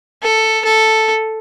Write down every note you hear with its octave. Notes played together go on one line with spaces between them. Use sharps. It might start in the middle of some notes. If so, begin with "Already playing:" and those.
A4
A4